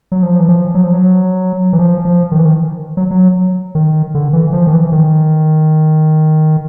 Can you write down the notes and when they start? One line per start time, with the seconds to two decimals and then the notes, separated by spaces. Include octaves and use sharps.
0.12 F#3
0.23 F3
0.40 E3
0.49 F3
0.75 F#3
0.84 F3
0.92 F#3
1.73 E3
1.79 F3
2.05 F3
2.32 D#3
2.38 E3
2.45 D#3
2.97 F#3
3.11 F#3
3.75 D#3
4.15 D3
4.33 E3
4.53 F3
4.67 D#3
4.73 E3
4.92 D#3